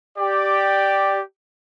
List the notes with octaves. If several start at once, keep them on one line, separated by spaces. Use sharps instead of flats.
G4 D5